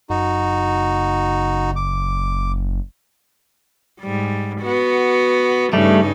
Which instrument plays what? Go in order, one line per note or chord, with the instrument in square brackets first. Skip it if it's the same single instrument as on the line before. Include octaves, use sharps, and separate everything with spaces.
[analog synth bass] F#1 [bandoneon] D#4 F#4
[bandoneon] D6
[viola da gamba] G#2 G3
B3 F#4
[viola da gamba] G2 C#3 D#4 [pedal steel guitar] G3 A3